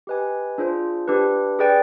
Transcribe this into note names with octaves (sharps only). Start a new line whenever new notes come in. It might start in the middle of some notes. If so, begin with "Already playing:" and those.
G4 B4 D#5 G#5
D4 F4 G#4 C5
D4 G4 B4
G#4 B4 D5 G5